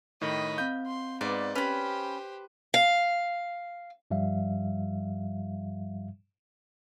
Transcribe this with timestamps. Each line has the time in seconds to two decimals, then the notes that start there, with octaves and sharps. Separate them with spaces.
0.21 A2 D#3 D#5 B5
0.58 C4 F5 G6
0.87 C6
1.21 G#2 B3 B4 D5
1.55 C#4 G4 B4 C5 B5
2.74 F5
4.11 G2 F3 G3 E5 F5